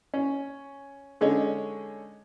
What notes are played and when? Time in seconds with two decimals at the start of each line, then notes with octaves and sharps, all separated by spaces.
0.14 C#4
1.21 D3 G#3 C#4 D#4 C#5